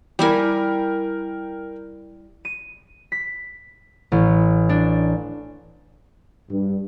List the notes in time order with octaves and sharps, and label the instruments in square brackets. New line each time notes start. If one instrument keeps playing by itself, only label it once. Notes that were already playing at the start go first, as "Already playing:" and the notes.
[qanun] G3 E4 G#5 [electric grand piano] A#4 G5
[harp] D#7
B6
A1
D4
[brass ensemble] G2